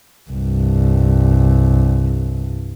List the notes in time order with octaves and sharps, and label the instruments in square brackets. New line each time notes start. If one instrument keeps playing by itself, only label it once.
[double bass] C2 G2